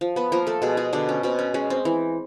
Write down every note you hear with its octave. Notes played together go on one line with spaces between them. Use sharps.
F3
B3 B4
F3 A#3 A#4
A3 A4
B2 G#3 G#4
G#3 G#4
B2 D3 D4
C#4
B2 C4
C#4
G#3 C#4
C4
E3